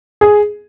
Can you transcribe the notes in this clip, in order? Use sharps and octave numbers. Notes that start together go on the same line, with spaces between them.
G#4